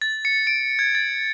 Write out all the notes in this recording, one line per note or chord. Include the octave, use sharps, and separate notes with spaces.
A6
C#7
D7
G#6
A6